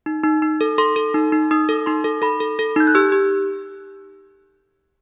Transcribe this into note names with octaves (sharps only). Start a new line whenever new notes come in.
D#4
D#4
D#4
A4
A4 C6
A4
D#4
D#4
D#4 D#6
A4
D#4 C6
A4
A4 B5
A4
A4
D#4 G6
F#6
G4 E6
G4